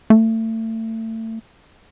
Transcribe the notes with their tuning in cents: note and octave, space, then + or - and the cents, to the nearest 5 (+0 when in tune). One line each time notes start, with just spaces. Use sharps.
A3 +30